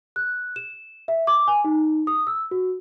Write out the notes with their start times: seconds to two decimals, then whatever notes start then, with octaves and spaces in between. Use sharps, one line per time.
0.16 F#6
0.56 E7
1.08 E5
1.27 D6
1.48 G#5
1.64 D#4
2.07 D#6
2.27 E6
2.51 F#4